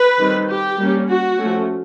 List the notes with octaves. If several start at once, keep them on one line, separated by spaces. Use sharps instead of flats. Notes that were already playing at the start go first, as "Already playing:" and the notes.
Already playing: B4
D#3 G3 C4
G4
G3 A#3 C#4
F#4
F3 A3 C#4